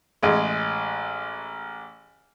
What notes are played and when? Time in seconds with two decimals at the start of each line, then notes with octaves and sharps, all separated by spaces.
0.23 A1 G#3